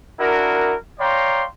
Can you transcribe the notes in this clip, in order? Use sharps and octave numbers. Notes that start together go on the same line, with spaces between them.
D4 E4 F#4 A#4
C#5 D5 F5 G5 A#5 C6